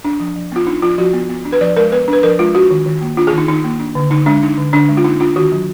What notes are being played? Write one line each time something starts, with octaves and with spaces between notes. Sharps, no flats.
D4
F3
F3
B3 F4
D4 D#4
F3 F4
F3 F#4
B3
B3
D4
B4
F3 D5
G#3 A#4
B3 B4
D4 B4
F3 A#4
G#3 F4
D4 F#4
D#3
D#3
A#3
D4 F4
G#4
D#3 D#4
D#3 D#4
A#3
D4
D3
D3 D#4
G#3 D4
D4 D#4
D3
D3 D4
G#3
F4
A#3 D#4
D4 F4
D#3 F#4
F#3